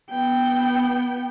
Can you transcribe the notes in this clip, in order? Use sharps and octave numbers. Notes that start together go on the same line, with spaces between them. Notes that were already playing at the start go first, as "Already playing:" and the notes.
B3 G5